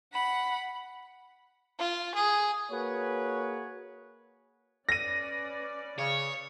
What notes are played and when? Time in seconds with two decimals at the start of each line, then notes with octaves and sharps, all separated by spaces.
0.13 F#5 B5
1.79 F4
2.15 G#4
2.71 A#3 F#4 G#4 B4 C#5
4.89 C#4 B4 D5 A#6 D#7
5.99 C#3 C#5